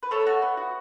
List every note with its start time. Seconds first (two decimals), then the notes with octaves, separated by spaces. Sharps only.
0.03 B4
0.11 A3 A4 C#5
0.27 F#4
0.42 B3
0.57 F#4